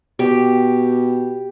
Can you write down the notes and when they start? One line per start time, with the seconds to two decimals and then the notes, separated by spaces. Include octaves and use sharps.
0.19 B2 G4